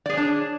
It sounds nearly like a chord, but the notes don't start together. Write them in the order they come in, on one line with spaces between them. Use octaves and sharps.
D5 G#4 C#5 D4